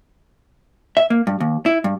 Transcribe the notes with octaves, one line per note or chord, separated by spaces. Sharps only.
E5
A#3
G2
D#2
E4
G2